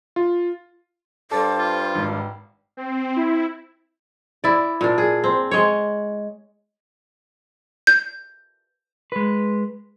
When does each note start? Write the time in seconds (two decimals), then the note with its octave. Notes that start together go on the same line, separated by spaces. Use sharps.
0.16 F4
1.31 G2 A4 C5 D5
1.58 F4
1.95 G#1
2.77 C4
3.16 E4
4.44 E4 D5
4.81 A#2 D4
4.98 G#4
5.24 C4
5.51 G#3 C#5
7.87 G6
9.12 G#3 B4